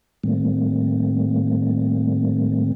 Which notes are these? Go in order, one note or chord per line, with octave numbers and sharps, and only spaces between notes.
A2 D#3 G3 A3 A#3 C4